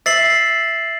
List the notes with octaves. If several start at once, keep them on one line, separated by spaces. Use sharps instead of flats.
E5 A6 C7 F#7